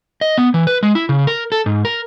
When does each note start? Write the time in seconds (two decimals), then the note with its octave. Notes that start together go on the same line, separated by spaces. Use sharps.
0.21 D#5
0.38 B3
0.54 E3
0.67 B4
0.83 G#3
0.95 E4
1.09 C#3
1.27 A#4
1.52 A4
1.66 G#2
1.85 A#4